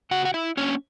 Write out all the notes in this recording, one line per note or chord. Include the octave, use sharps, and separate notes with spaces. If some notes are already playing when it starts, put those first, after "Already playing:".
C#3 F#4 F#5
F#5
E4 E5
F#3 A#3 C#4 D4 C#5